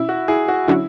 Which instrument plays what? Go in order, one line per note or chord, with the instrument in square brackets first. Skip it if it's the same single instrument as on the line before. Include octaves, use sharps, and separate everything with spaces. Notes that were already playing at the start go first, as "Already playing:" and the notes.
Already playing: [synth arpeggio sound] B2 C#4 [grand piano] E4
[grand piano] F#4
E4 G#4
F#4
[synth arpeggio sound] D3 F#3 C#4 F#4 [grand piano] E4